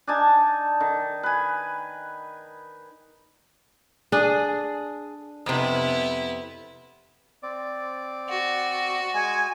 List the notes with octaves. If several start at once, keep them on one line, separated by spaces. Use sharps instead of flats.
D4 D#4 G#5 A5
D#3
B4 G#5
D4 G#4
F2 C3 B3 E4
C4 D5
F#4
G#3 G#5